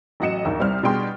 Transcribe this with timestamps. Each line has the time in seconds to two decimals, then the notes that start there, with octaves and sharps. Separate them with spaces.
0.20 A1 F#3 F#4 D#5 C#7 E7
0.45 A#1 D#2 A#4
0.60 C2 G3 C4 C5 F6
0.83 B2 G3 D4 G#4 G5 C6